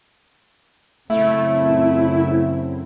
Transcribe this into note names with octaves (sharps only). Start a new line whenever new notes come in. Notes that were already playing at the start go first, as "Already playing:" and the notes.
F#2 C#3 A3 C4 E4